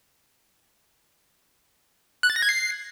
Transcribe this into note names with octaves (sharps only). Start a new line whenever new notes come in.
F#6
A6
A#6
G#6
C7